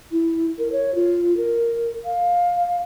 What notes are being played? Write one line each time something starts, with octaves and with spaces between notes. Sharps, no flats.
E4
A#4
C#5
F4
A#4
F5